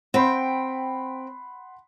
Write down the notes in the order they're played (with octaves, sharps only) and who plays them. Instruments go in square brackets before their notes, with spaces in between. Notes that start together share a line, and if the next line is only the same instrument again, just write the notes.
[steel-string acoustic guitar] C4 G5 [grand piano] F#5 B5 C6